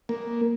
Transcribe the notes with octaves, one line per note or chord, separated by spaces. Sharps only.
A#3